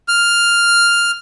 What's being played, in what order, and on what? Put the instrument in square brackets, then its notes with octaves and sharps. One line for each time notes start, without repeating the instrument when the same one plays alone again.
[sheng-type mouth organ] F6